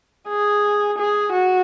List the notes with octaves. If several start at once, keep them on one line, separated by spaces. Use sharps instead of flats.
G#4
G#4
F#4